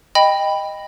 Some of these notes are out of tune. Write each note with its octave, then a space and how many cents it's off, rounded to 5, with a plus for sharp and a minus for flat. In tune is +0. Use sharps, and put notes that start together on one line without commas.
D#5 +0 G5 +15 B5 +0